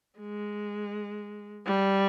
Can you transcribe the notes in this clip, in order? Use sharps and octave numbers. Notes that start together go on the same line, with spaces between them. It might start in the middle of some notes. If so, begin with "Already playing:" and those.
G#3
G3